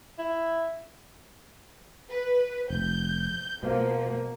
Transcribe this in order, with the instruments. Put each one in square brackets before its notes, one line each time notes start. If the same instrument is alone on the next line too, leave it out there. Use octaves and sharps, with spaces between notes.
[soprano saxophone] E4
[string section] B4
[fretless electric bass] F1 [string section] G6
[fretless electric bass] B2 [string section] F3 [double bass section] A#3